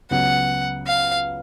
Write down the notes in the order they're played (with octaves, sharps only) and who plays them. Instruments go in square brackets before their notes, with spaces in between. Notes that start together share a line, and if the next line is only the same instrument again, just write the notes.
[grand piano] C#2 C#3 F#3 B3 [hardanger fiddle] F#5
[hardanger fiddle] F5